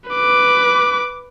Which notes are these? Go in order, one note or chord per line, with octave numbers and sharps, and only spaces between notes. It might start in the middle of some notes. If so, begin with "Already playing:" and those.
B4 D6